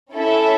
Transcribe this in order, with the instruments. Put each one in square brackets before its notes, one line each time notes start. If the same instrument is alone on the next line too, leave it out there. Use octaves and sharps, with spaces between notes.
[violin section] C#4 E4 A4 E5